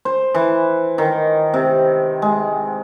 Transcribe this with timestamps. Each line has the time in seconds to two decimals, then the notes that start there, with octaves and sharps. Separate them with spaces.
0.05 C5
0.34 E3
0.98 D#3
1.54 C3
2.22 G#3